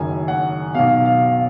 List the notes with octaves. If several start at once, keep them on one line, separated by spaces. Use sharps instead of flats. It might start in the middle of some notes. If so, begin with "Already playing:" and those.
Already playing: F#1 F#2 D#3 G#5
F#5
B1 B2 F5
F5